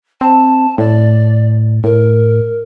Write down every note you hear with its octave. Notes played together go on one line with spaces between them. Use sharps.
C4 A5
A2 D5
A2 A#4